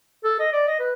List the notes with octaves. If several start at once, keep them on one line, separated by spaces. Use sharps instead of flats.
A4
D#5
D5
D#5
B4